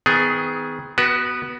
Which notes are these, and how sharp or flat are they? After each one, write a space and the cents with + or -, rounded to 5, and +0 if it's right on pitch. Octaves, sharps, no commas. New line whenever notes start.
D#3 +30 B3 +30 G#4 +0
B3 +0 F#4 +20 B4 -25